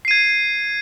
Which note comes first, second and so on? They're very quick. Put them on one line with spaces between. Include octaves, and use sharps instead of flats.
C7 D#7 G#6